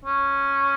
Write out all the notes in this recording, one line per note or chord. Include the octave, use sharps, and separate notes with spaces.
C#4